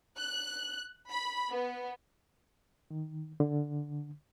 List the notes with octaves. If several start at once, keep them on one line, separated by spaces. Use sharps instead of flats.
F#6
B5
B3
D#3
D3